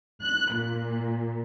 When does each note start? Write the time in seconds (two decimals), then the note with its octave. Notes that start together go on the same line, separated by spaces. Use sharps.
0.22 F#6
0.53 A#2